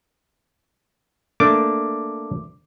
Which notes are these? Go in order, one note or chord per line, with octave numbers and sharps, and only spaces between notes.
A3 A#3 D4 D6